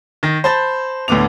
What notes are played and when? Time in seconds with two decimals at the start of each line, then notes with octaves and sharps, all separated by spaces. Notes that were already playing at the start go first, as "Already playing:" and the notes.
0.23 D#3 A#6
0.44 C5 A5 B5 G6 A6
1.08 D2 A2 D3 B3 D6 F7